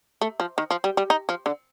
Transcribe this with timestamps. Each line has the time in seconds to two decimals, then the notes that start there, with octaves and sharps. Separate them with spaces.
0.21 A3
0.40 F3
0.58 D#3
0.71 F3
0.84 G3
0.97 G3
1.10 D#4
1.29 F3
1.46 D3